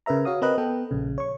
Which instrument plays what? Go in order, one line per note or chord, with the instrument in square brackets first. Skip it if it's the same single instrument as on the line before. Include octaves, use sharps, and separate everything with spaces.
[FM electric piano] C#3 A#4 B4 E5 A#5
F#4 C#5 F5 D#6
C4 A#4 B4 D#5 F#6
B3 A4 G5
A#1 C#3
C#5 C#6